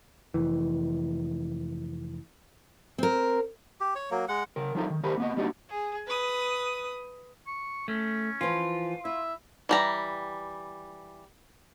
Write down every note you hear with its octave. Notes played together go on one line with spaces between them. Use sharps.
F1 E3
C4 A#4
G4
C#5
F#3 A#3
G#3 F#5
C#3 A#4
F3 F#3 D#4 A4 A#4
D#3
D#2 G4 A#4 C5 B5
A#3 B3 D#5
G3 A#3 D4 D#4 F#4 D5
G#4
B4 D#6
C#6
A3 C#4
E3 F3 F4
E4 E5
E3 G3 A#5